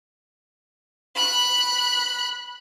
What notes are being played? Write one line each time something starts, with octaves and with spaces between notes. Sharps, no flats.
B5 F#6